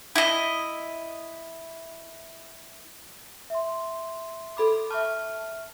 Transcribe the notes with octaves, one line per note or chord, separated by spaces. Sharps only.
E4 D#5
E5 C6
A4 B5 D6
E5 A5 C#6 F6